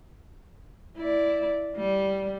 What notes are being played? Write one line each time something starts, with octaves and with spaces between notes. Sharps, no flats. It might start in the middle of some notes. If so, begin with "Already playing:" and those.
E4 D5
G3